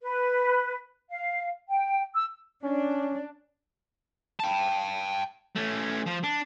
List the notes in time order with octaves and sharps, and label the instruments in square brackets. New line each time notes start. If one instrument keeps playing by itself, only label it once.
[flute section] B4
F5
G5
E6
[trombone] C#4 [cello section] D4
[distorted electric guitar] G5 A5
A3 C#4
F3
D4